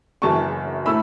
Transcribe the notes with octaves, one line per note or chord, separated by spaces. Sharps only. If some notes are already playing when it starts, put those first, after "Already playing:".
F#1 F#2 E3 A5 C#6
A2 A3 E4 B5 E6